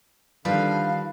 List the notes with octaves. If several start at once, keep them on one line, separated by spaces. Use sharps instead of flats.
D3 D#3 F3 G3 B4 F5